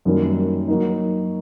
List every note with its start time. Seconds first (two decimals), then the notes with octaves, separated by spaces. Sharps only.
0.05 F#2 D#3 G3 A#3
0.68 F#3 A#3 D#4